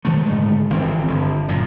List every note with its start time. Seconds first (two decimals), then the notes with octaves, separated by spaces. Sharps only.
0.05 D#3 F#3 G#3 A3
0.26 G#2 D3 G#3 A3
0.70 G1 D#3 E3 C4
1.07 G1 D3
1.48 F#2 A#2 C#3